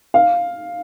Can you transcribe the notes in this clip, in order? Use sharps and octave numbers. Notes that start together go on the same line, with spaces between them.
F5